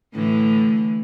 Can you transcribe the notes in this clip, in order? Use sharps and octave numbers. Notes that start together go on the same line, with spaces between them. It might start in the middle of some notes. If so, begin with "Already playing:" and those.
A2 D3 E3